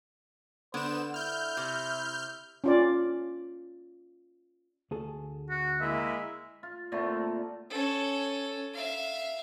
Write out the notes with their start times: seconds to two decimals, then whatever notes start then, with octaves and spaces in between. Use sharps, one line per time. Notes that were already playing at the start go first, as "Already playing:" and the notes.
0.74 D3 B3 C5 E7
1.14 E4 F6 G6
1.57 C3
2.64 C#4 F4 D5
4.91 D2 G#4 A4
5.50 F#4
5.81 G#3 A#3 E4 E5
6.63 F4
6.92 A#2 D3 A3 C4
7.70 C#4 A4
8.73 E5 F5